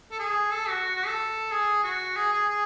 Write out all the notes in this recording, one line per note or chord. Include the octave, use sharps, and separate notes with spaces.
A4
G#4
A4
F#4
F#4
F#4
A4
G#4
F#4
G#4
G#4
G#4